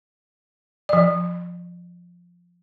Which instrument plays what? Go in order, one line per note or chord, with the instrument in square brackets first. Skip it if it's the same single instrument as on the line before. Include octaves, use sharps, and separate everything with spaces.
[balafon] F3 D5